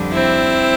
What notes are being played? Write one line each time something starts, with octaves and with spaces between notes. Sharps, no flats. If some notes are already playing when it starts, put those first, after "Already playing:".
Already playing: F2 D3 G3
C4 E4